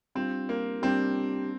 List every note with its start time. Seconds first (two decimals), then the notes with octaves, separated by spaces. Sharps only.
0.15 G3 C4 D4 F4
0.49 A#3
0.82 G3 C4 D4 G4